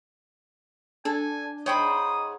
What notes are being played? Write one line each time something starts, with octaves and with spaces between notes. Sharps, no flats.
D4 A4 G#5
G#2 C5 C#5 G5 B5 D#6